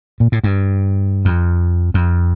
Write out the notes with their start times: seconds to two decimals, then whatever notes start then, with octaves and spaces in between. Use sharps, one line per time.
0.20 A#2
0.32 A2
0.44 G2
1.25 F2
1.94 F2